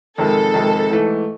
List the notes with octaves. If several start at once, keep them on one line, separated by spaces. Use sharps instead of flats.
F2 C3 D#3 G#3 A4
F2 C3 D#3 G#3
G#2 E3 A3